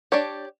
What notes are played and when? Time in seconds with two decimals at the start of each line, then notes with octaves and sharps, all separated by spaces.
0.12 D4 G4 C#5